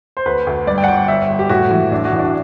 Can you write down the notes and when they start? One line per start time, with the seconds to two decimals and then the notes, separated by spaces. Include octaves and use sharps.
0.17 C5
0.26 D2 B4
0.47 D2
0.67 G2 D5
0.78 G5
0.84 F#5
0.88 G1 G5
1.08 G1 E5
1.29 G1
1.39 G4
1.49 A2 F#4
1.71 E3
1.91 A1 D4
2.05 F#4
2.13 A1
2.19 D4